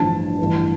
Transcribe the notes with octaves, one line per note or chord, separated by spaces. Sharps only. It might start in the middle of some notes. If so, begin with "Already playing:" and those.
Already playing: A1 G2 D3 F3 A5
A1 G2 E3